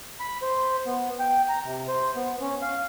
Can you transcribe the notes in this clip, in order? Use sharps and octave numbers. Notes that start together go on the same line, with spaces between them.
B5
C5
B3
G5
A#5
C3
C5
B3
C#4
F5